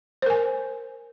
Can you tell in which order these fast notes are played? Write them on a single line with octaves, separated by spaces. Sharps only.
C5 A#4 G#5